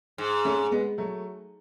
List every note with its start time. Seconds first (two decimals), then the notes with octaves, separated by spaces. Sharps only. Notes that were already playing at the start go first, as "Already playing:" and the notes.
0.18 G#2
0.45 A3 C#4
0.71 G#3 B3
0.98 F#3 A3